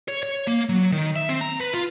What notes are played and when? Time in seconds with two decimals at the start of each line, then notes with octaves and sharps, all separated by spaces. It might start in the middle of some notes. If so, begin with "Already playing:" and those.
0.08 C#5
0.23 C#5
0.47 A#3
0.69 F#3
0.92 D#3
1.16 E5
1.29 C4
1.41 A#5
1.60 B4
1.73 F4